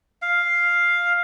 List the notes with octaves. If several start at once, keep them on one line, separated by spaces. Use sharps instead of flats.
F5